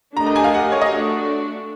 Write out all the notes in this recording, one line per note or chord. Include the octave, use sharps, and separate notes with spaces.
A3 D4 G4 A#4 D#5 A#5
A#5
G#5
F5
F#5
C#5
D#5
A3 D4 F#4